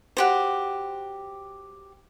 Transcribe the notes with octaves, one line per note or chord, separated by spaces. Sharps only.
F#4 G4 C5